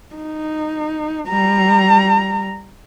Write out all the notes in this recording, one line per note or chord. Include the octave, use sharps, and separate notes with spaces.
D#4
G3 A#5